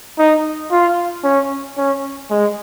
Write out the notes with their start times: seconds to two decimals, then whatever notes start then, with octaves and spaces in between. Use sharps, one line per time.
0.19 D#4
0.72 F4
1.24 C#4
1.78 C#4
2.31 G#3